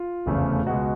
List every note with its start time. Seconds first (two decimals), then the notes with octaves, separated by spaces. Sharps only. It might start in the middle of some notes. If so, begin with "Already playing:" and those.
Already playing: F4
0.26 F1 E2 C#3 F3 A3
0.66 C#2 B2 G#3 F#4